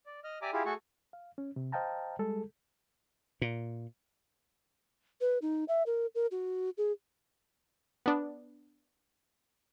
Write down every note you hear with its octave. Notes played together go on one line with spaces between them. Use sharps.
D5
D#5 F6
G4 D5 E5 G#5 A#5 D6
E4 F4 G4 G#4
A3 F#4 G#4 A4 C#6
F5
C#4
C3
C5 D#5 F5 G5 A5 A#5
G3 G#3 G#4 A4
A#2
B4
D#4
E5
A#4
A#4
F#4
G#4
B3 D4